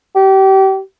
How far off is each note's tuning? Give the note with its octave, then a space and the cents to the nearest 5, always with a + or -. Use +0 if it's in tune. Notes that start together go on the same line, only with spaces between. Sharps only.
G4 -30